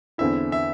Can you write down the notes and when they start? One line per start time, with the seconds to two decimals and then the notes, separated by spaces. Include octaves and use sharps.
0.18 E2 D3 C4 E4 E5
0.52 E5